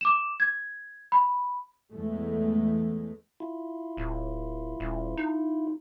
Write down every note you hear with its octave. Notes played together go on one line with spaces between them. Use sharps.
D6 E7
G#6
B5
E2 G#3 A3
E4 F4
D1
D#1
D#4